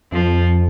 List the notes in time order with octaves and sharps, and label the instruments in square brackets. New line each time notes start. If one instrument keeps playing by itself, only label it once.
[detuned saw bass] F2 [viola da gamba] F3